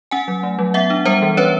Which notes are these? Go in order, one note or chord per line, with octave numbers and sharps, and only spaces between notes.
C#4 F#5 G#5
F#3
A3
F#3
B3 E5 F#5
D4
G3 A#4 C5
E3
C#4 B4 C#5